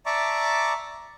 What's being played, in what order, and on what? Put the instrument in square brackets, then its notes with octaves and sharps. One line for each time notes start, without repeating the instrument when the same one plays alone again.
[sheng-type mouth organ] D5 E5 A5 A#5 C#6 D6